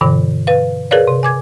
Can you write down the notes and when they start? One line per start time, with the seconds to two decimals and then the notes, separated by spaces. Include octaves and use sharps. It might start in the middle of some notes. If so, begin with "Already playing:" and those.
0.01 G2 B2 D3 E3
0.47 B4 F5
0.91 G#4 A#4 B4 C#5 D5 F5
1.08 C3
1.23 G#5 D6 G#6